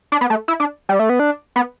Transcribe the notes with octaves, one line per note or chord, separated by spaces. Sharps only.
D4
B3
A3
E4
D4
G3
A3
B3
D4
B3